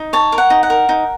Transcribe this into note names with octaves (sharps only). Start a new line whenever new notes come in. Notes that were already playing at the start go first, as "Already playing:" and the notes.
Already playing: D#4
C#5 A5
A#4
F#5
D#4
F#5
A#4
D#4